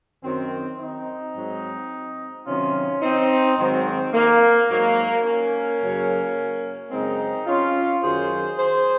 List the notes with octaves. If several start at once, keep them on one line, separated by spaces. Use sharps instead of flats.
F#2 D#3 F#3 C4
C4 D#4
G#2 F#3
C3 D#3 F#3 C#4 F4
C4 D#4
G#2 D#3 F#3 C4
A#3
G#2 F#3 A#3
A#3 C#4
F#2 C#3 F#3
F#2 C#3 G#3 C4 D#4
C#4 F4
F#2 D#3 F#3 G#4 C5
G#4 C5